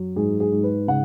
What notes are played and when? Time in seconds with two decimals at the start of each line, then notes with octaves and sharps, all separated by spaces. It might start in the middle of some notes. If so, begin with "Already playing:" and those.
Already playing: F#2 F#3
0.16 G#2 G#4
0.40 G#4
0.52 G#2
0.64 B4
0.88 C#3 F#5